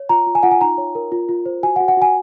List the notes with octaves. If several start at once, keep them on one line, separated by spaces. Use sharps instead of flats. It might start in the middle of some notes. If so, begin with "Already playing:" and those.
Already playing: C#5
F4 A#5
F4
G#5
F4 F#5
G#5
D#4 A#5
C#5
A#4
F4
F4
C5
F#4 G#5
F#5
F#4
F#5
F#4 G#5